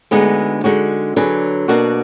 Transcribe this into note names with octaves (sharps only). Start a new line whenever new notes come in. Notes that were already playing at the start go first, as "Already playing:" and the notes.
D2 D3 G#3 B3 D#4
D3 G#3 D#4 F#4
D3 F#3 D4 G#4 B4
B2 A#3 D4 F#4